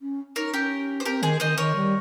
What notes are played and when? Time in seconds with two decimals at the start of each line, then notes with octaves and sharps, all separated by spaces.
0.02 C#4
0.36 D#4 A#4 C#5
0.54 C#4 G4 A#4
1.00 C5
1.06 C4 G4 A#4
1.23 D#3 G#4 C5
1.40 D#3 C5 D#5
1.58 D#3 A#4 C#5
1.75 G3